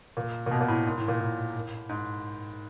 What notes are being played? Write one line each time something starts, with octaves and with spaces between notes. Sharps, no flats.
A#2
A#2
B2
A#2
A2
G#2
A2
A#2
A2
G#2